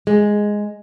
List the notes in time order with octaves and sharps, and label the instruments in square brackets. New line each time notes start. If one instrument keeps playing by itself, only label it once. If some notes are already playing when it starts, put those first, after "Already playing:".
[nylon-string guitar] G#3